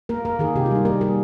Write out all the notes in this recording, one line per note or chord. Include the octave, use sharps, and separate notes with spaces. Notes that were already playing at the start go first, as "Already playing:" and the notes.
A#3 A#4
A#3 A#4
D#3 G#4
C3 G4
F4
G3 D#4
A#3 A#4
G3 G#4